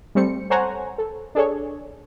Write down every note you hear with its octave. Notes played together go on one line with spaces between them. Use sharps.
G3 A3 C4 C#7
A4 C5 C#5 F#5 G#5 A#5
A4
D4 G#4 A4 C#5